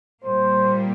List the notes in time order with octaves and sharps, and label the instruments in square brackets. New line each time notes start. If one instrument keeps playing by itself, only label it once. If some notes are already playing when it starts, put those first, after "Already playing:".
[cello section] A#2 G3 A#3 [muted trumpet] C5